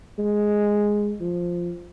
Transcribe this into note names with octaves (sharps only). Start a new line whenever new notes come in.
G#3
F3